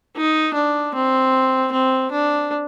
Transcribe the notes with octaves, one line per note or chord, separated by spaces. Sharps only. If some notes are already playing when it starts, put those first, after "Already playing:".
D#4
D4
C4
C4
D4